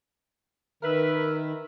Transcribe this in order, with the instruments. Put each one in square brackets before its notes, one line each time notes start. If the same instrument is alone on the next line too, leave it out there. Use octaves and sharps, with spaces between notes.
[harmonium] D#3 [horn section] A#4 B4 E5